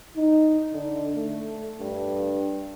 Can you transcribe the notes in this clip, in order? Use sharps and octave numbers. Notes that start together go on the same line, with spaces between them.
D#4
D3
A3
G2